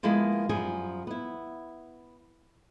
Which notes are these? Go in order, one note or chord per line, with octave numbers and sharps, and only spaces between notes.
F3 G#3 A#3 B3 E4
F#2 F3 G3 G#4
B3 E4